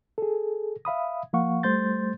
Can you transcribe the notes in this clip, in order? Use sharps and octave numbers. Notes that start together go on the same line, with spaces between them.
G#4 A4
E5 F5 B5 D#6
F3 A#3 F5 F#5 C#6
G3 A3 C5 C6 G6 A6